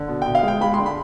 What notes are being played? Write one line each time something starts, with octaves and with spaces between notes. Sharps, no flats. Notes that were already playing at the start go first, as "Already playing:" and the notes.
Already playing: D3
B2
B2 G5
F5
G#3
G5
G#3 B5
D3 C6
B5